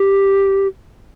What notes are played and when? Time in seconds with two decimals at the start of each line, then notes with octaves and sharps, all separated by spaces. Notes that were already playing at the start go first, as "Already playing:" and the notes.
Already playing: G4